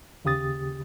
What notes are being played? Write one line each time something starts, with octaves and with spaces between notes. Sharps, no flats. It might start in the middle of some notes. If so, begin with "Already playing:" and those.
D#2 C#3 G4 D#6 A6